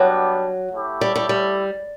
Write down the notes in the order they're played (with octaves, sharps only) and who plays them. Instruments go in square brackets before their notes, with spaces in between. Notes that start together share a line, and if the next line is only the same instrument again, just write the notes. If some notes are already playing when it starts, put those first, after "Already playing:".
Already playing: [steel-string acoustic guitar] F#3 [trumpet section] G3 B3 D4
[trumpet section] A3 E4 G4
[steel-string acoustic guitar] G3
G3
G3